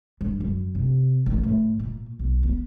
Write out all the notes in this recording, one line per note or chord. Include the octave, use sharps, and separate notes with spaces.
G2
F#2
C3
A1
A2
A#2
B1
B3